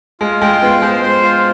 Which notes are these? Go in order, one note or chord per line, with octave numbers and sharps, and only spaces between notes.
G#3 F4
G#3 G5
B3 F4
G#3 C5
C5
F4